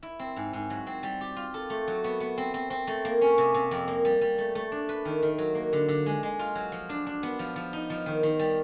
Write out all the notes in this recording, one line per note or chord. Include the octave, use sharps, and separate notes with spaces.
E4
C4
G#2
G#2
F#3
C4
G3
G4
F4
A4
A3
F#3
B3
B3
C4
C4
C4
A3
A#3
C#4
C3
C3
F2
A#3
G3
G3
A3
A3
D4
B4
D#3
D#3
F#3
A#3
D3
D3
G#3
G#3
F4
F#3
F3
D4
D4
B3
F3
F3
D#4
F3
D#3
D#3
G3